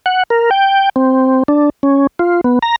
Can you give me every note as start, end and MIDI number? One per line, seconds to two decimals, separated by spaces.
0.06 0.23 78
0.30 0.50 70
0.51 0.89 79
0.96 1.43 60
1.48 1.70 62
1.83 2.07 61
2.19 2.41 65
2.44 2.59 59
2.62 2.76 82